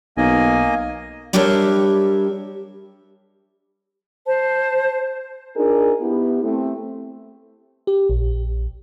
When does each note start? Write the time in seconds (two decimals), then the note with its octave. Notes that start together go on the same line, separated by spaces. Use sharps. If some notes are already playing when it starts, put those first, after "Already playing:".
0.17 B1 A#3 D#5 G#5
1.33 G3 D4 G4 A#4 C#5 E5
4.27 C5 A5
5.56 D4 D#4 F4 G#4 A#4
6.00 B3 E4 G4
6.43 A3 C4
7.87 G4
8.09 A#1